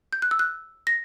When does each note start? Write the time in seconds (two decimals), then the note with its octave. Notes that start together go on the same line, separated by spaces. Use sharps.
0.13 G6
0.22 F#6
0.31 E6
0.39 F#6
0.87 A#6